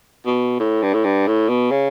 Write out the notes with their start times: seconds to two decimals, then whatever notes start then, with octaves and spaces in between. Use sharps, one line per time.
0.26 B2
0.59 A2
0.82 G2
0.93 A2
1.04 G2
1.27 A2
1.49 B2
1.71 C#3